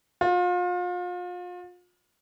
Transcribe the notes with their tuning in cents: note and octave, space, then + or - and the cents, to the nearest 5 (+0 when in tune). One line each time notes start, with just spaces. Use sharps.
F4 +35